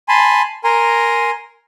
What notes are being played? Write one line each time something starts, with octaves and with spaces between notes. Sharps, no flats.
G#5 A5 B5 C6
A#4 G#5 A#5 C6